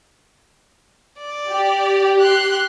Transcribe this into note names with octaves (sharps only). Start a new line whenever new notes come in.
D5
G4
C6 F#6